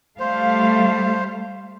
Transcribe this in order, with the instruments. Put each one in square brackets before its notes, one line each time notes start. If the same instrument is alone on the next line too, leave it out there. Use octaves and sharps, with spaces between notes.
[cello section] G3 A3 F5 [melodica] C5